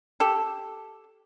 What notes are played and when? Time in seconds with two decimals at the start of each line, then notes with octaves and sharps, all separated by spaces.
0.20 G4 A4